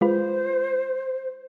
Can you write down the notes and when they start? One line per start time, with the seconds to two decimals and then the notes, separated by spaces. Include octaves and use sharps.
0.01 G#3 F4 B4 C5